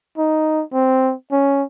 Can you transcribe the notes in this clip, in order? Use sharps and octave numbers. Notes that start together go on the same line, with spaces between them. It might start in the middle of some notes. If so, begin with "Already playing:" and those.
D#4
C4
C#4